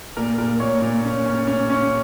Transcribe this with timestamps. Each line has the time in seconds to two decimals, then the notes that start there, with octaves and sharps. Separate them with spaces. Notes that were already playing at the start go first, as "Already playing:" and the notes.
0.17 A#2 A#4
0.38 A#2 A#4
0.60 A#2 C#5
0.82 A#2
1.04 C#4
1.25 C#4
1.47 C#4
1.70 C#4